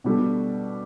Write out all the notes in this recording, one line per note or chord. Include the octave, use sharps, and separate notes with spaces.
B2 G3 D4 A4